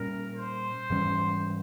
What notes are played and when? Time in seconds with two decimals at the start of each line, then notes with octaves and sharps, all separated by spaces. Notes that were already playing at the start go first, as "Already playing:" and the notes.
Already playing: A#2 G3 C#4 A#4
0.36 C5
0.90 G#2 E3 G3 C#4